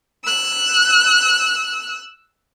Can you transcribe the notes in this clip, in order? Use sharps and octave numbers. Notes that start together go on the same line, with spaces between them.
E6 F#6